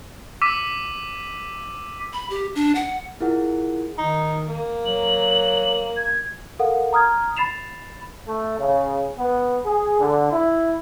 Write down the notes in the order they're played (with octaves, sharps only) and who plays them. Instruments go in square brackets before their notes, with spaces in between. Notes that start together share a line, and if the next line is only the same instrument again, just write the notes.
[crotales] D6 E6 B6 D#7
[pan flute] B5
G4
D4
F#5
[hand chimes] E4 F4 G#4 A#4 F#5
[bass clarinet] D#3 [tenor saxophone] D#4
[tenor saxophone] A#3
[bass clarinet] F#3 [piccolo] F#7
[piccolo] G#6
[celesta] A4 A#4 F5 F#5
A#5 D#6 F6 G#6
B5 A6 C7 E7 F7
[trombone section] A3
C#3
B3
G#4
D3
E4